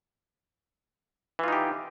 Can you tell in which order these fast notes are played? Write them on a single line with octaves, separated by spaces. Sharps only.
E3 F4 D#4 G4